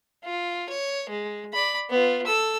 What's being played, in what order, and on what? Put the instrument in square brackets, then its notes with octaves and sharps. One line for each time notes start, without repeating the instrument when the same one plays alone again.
[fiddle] F4
C#5
G#3
D5 B5
B3 F4
A4 E6